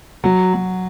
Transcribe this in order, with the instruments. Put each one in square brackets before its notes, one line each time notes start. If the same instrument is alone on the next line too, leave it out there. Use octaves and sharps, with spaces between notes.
[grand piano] F#3
F#3